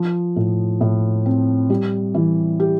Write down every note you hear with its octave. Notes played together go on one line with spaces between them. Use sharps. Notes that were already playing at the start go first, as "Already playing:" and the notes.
Already playing: F3
A2
A2
C4
G3
E3
G4